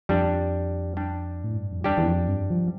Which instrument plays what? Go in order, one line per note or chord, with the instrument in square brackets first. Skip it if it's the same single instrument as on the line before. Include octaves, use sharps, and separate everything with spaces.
[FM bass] F2 [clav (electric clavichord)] G3 D4 G4
[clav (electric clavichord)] G3 D4 G4
[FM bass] A2
G2
F2
[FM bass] E2 [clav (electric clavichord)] G3 D4 G4
[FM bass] E2
F2
G2
F3